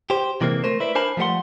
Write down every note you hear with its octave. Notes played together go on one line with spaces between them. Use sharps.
G4 C5
C3 E3 G#3 A#3 C4
A3 A#4 C5
E4 B4 D5
D4 A#4 C5 G#5 A5 B5
F3 G3 A3 B4 F#5 C6